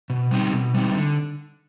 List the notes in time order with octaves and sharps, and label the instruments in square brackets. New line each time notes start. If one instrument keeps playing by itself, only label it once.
[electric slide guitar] B2
G3 C4 D#4
B2
G3 C4 D#4
D3